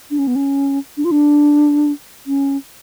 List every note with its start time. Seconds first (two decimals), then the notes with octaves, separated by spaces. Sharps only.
0.11 D4
0.19 C#4
0.27 B3
0.36 C#4
0.97 D4
1.05 F4
1.11 D4
2.27 C#4